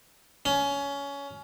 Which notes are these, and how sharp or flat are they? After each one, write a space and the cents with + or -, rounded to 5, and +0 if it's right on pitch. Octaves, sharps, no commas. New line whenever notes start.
C#4 +20